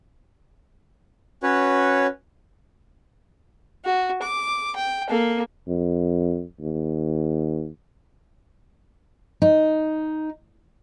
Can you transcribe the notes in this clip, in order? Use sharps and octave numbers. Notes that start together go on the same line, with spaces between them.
C#4 F#4 B4 C#5
F#4
D6
G5
A#3 A4
F2
D#2
D#4